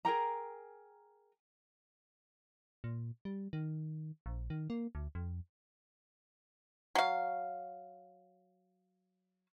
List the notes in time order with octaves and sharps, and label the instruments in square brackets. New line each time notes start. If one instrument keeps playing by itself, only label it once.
[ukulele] G#4 A#4 G5 A#5
[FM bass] A#2
G3
D#3
A#1
D#3
A#3
D2
F2
[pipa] F#3 F5